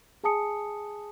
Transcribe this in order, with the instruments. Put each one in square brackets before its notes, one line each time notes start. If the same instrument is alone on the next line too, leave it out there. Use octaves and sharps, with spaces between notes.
[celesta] G#4 G#5 A5 D#6 C#7